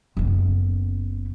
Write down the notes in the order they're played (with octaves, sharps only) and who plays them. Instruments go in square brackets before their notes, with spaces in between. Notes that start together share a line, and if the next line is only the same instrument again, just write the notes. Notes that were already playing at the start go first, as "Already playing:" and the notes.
[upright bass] F#1 B3